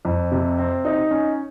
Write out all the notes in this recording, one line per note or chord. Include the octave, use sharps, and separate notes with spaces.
F2
C3
C4
D#4
C#4